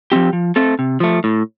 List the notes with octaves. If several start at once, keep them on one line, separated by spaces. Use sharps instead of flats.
F3 C4 G4
F3
A3 C4 A4
C3
F3 A3
A2